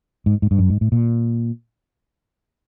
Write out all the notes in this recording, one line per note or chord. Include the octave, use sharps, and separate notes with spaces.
G#2
G#2
G2
F#2
G#2
A2
A#2